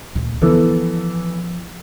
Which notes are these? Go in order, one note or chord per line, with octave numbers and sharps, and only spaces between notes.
D2 A#2
E3 F3 B3 A4